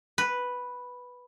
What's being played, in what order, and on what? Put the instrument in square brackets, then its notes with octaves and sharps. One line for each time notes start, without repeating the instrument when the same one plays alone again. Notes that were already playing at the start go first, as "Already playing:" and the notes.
[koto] B4